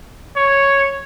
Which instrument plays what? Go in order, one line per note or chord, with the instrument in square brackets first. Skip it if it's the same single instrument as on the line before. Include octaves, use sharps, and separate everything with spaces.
[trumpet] C#5